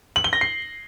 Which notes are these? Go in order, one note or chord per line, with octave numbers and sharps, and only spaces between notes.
F#7
G7
A#6
C7